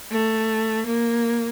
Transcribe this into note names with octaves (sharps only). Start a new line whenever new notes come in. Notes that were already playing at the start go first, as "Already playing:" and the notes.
A3
A#3